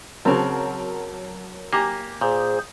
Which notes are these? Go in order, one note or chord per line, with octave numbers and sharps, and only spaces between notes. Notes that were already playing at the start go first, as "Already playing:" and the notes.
C#3 F#3 C4 A#4 A5
A#3 G4 G#5 A#5
A#2 G#4 C5